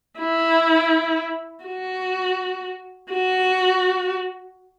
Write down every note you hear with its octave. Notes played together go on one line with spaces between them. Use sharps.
E4
F#4
F#4